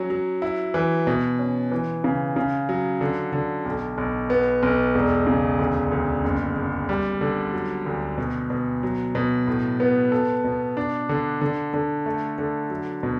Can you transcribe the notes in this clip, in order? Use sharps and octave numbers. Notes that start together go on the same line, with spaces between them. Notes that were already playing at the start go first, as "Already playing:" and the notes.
Already playing: F#3 C#4
F#3
E4
E3
B2
C#4
E3
C#3
C#3
F#3
D3
D3
B1
B1
B3
B1
E1
C#3
D2
D2
F#1
F#1
G3
D3
F#3
D2
B2
B2
F#3
B2
A2
B3
A4
B2
D4
D3
D3
D3
A3
D3
F#3
B2